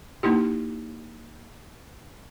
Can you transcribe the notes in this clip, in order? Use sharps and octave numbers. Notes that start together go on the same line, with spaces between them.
A#3 D#4 E4 G4